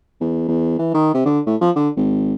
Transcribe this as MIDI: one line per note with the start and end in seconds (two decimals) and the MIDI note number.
0.21 0.48 40
0.48 0.77 40
0.79 0.94 52
0.94 1.12 51
1.14 1.25 48
1.26 1.40 50
1.47 1.56 45
1.61 1.70 53
1.76 1.89 50
1.97 2.34 32